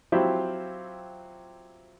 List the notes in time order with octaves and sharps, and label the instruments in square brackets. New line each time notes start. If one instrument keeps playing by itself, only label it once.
[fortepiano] F#3 C4 E4 F4 G4